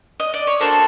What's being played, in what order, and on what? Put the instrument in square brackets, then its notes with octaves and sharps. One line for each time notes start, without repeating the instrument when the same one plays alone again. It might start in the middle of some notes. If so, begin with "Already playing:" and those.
[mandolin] D#5
D5
C#5
A#3 D4 F#4 A4 C5